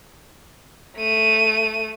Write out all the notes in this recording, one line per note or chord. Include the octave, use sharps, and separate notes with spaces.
A3 D#7